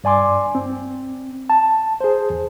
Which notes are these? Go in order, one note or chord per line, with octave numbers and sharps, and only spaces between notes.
G2 D5 G#5 C6 D6
C4
A5
G#4 C5
E2